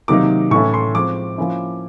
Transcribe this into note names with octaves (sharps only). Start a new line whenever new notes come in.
C3 D#3 F#3 A#3 D#4 D6
A2 E3 A3 C#4 E4 C#6
C6
F3 G#3 C4 D6
F3 A#3 C#4 E4